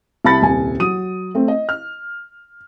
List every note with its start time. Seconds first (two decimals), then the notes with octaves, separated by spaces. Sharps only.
0.25 C2 E4 A5 B5 A6 C#7
0.42 D#1 C2 G#5
0.80 F#3 D#6 D#7
1.35 A3 C4
1.48 D#5
1.69 F6